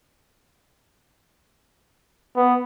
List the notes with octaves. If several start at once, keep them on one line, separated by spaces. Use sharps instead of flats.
B3